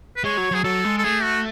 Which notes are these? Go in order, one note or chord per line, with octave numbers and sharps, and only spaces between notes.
B4
G#3 C#5
F#3
F#3 G#4
F#3 A4
G#3
A4
A3 G#4
F#4